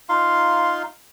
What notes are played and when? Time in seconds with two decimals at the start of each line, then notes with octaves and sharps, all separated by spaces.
0.09 D#4 F4 F5 C6